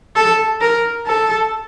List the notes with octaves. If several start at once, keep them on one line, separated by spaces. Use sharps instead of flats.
A4
A#4
A4